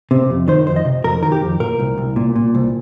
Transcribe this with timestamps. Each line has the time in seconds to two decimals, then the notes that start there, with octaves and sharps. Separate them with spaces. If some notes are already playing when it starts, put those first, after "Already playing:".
0.11 C3
0.30 F2
0.48 D#3 C5
0.67 F2 C5
0.76 D#5
0.85 C3
1.04 F2 A#4
1.22 D#3 A#4
1.32 G4
1.42 F2
1.60 A#2 A#4
1.79 C2
1.98 C2
2.16 A#2
2.36 A#2
2.55 C2